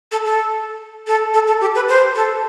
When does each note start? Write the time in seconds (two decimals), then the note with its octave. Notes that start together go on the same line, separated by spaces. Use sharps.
0.11 A4
0.25 A4
1.07 A4
1.34 A4
1.47 A4
1.61 G4
1.75 B4
1.89 C5
2.15 A4